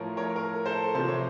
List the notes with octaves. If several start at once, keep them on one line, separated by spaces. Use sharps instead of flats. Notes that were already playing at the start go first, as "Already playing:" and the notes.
Already playing: A2 F3 A#4 C#5
A#4 C#5
A#4
A4 C5
C3 F3 C5
C#5